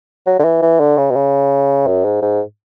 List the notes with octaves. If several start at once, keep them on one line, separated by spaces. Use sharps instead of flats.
F#3
D3
E3
E3
D3
C#3
B2
C#3
F#2
G#2
G#2